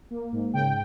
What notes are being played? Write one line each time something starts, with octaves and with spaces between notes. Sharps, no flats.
A#3
G#2
C#3 G5